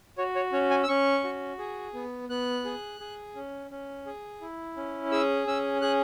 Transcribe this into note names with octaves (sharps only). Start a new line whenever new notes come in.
F#4 C#5
C#5
C#4 C#5
G#5
E6
C#4 C#6
F#4
G#4
B3
B3 F#6
G#4
G#4
C#4
C#4
G#4
E4
C#4
G#4 E6
C#4 E6
G#4 F#6